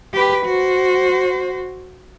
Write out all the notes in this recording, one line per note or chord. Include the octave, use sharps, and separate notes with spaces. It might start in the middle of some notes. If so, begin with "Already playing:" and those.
G4 B4
F#4 C5